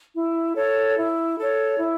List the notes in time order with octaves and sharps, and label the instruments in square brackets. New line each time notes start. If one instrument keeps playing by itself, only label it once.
[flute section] E4
A4 C#5
E4
A4 C#5
E4